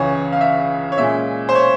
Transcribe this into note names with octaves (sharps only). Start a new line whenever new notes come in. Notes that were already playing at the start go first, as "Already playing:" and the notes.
Already playing: C#2 C#3 E3 C#5
F5
E5
C#5
A#2 G#3 C#4 E5
C5
C#5